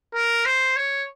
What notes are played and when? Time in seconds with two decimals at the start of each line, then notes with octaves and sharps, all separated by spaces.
0.14 A#4
0.45 C5
0.76 C#5